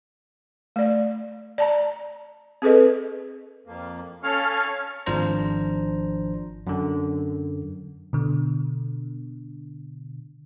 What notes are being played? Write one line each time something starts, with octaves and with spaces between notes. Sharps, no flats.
A3 D5
D5 A5 A#5
C4 G#4 A4 B4 D#5
F2 A#3
C#4 A4 C#5 F5 F6
G#1 F3 D4 C5 A#5
F#2 D3
B2 D3